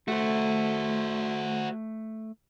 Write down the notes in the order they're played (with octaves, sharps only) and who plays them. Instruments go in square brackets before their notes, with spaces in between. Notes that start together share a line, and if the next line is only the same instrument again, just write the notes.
[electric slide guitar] A3 [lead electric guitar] F#4 C5